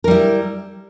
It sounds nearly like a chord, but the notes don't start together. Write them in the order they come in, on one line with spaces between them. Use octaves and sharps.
A#4 G3 E4